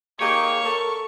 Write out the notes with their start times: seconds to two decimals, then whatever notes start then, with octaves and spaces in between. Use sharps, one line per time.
0.21 A#3 D#4 G4 G#4 C#5 C#6
0.64 A4 A#4